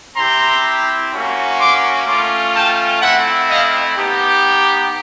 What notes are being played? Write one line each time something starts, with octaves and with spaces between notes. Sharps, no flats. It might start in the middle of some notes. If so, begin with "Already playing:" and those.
C4 E4 G4 A#5 C6
A#3 C#4 F#4
C6 D6
A3 C#4 F4 C6 D6
G5 A5
A3 C4 E4 E5 F#5
D#5 F5
B3 D#4 G4